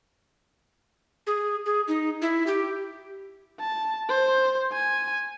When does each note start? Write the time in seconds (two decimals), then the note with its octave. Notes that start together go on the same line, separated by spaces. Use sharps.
1.27 G#4
1.66 G#4
1.88 D#4
2.22 E4
2.47 G4
3.60 A5
4.09 C5
4.73 G#5